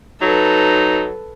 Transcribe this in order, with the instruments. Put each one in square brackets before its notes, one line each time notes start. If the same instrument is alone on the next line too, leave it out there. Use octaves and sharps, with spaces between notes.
[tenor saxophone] F#3 [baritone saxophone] D#4 [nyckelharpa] A4 B4